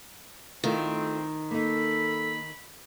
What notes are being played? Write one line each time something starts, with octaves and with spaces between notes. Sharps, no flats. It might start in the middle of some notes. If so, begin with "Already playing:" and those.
D#3 A3 C4 E4 F4
A#3 D#4 A4 B5